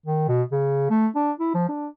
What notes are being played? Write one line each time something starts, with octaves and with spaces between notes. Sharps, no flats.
D#3
B2
C#3
A3
D4
E4
F3
D4